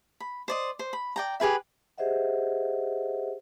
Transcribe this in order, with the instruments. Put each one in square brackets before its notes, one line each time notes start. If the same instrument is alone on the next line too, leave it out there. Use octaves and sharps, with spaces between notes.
[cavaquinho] B5
C5 D5 D#5
C5
B5
D5 G5 A#5
G4 G#4 B4 E5
[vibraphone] G4 G#4 C5 D#5 E5 F#5